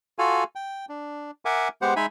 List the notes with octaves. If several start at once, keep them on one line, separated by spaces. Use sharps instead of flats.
F4 F#4 A4 F5 G#5
G5
D4
A#4 E5 F#5 G#5 D6
G#3 B3 G4 C5 F#5
G#3 D#4 E5 G#5 B5